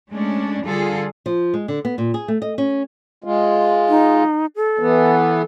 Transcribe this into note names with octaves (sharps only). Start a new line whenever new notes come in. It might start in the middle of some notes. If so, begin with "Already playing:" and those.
G#3 A3 C#4 D4
D3 G3 F4 G#4 A4
F3
G#3
D3
B3
A#2
G#4
A3
D#5
C#4
G#3 F4
D#4
A4
E3 B3